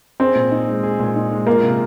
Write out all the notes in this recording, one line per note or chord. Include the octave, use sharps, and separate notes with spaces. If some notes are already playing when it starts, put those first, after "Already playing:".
C4 G#4
A#2
D#4
G#3
G#4
A#2
D#4
G#3
A#3 F4
C3